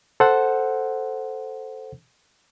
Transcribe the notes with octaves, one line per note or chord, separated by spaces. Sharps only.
A4 C5 F#5